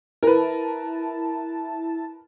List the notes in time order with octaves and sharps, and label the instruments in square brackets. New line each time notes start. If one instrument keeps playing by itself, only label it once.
[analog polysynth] E4 A5 [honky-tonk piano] A#4 B4